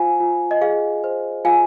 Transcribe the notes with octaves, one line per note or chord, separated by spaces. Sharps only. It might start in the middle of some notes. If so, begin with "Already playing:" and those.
Already playing: F4 C5 F5 G#5
F4
D#5
G#4 F5
C5
F4 F5 G#5